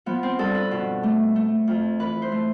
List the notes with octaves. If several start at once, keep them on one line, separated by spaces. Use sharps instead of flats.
F3 B3
C4
G2 A4
B4
B2
A3
A3
F2
E3 B4
C5
A3